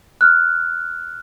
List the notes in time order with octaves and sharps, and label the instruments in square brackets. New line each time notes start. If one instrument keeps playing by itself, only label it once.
[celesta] F6 F#6